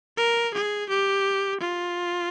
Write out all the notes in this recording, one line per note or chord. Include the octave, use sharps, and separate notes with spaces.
A#4
G#4
G4
F4